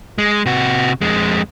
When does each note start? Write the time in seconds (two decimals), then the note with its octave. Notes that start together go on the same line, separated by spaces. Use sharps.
0.18 G#3
0.46 C3 F#4
1.01 F2 G#3